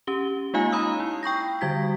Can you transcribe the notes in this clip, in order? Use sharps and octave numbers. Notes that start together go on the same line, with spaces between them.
C#4 G4 G7
G#3 A#3 D#4 F4 F5 G#5
A#5 B5 D#6 E6
E4
G5 C#6 G6 A#6
D3 G3 F#4 G#6 B6